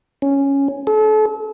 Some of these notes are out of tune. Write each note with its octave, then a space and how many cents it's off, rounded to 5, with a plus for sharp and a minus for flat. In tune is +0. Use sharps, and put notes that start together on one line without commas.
C#4 +0
A4 -35